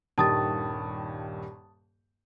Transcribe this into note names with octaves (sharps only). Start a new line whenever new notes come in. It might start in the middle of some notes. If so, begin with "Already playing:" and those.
D#1 G2 D#3 A5 D#6 A6